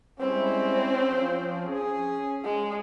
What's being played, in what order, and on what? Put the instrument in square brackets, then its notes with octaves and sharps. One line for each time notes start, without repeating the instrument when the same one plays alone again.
[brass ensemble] G3 G#3 E4 [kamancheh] C4 C#4
[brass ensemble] F3
C#4 G#4
[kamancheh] G#3